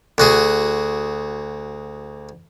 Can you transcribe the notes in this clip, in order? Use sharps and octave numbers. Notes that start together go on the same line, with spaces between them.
D2 F#4 G#4